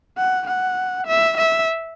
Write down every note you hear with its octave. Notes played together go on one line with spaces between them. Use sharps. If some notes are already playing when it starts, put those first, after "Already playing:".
F#5
F#5
E5
E5